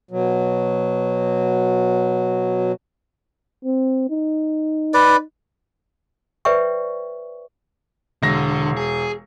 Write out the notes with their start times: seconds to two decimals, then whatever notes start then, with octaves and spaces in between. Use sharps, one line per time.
0.11 B2 F#3
3.65 C4
4.10 D#4
4.94 B4 D5
6.45 B4 C5 D5 E5 G5 C#6
8.23 E1 D3 A#6
8.77 G#4